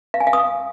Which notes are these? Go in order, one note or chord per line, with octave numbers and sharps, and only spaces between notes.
F5
G#5
F5
D#6